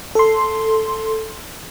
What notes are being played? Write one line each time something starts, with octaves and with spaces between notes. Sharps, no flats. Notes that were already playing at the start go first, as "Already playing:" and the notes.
A4 C6